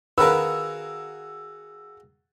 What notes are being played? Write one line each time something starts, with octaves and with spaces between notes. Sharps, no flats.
D#3 F#4 G#4 A#4 B4 F5 E6